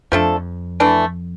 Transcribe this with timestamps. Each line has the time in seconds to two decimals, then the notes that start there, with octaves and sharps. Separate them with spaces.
0.12 F2 F3 A3 D4 A4
0.80 E3 A3 D4